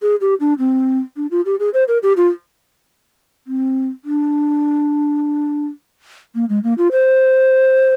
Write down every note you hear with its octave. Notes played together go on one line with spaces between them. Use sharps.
G#4
G4
D4
C4
D4
F4
G4
G#4
C5
A#4
G4
F4
C4
D4
A#3
G#3
A#3
F4
C5